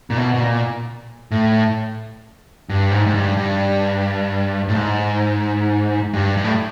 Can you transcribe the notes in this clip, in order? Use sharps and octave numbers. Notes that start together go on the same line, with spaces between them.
A#2
B2
B2
A#2
A2
G2
G#2
G#2
G2
G2
A2
G#2
G2
G2
A2